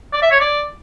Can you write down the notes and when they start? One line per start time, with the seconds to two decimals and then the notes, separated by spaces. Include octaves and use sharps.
0.13 D5
0.22 E5
0.32 C#5
0.41 D5